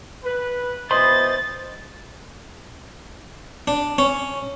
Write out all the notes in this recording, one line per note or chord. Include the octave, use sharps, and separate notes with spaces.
B4
B2 E3 C5 D#5 B5 C6 A6
D4
C#4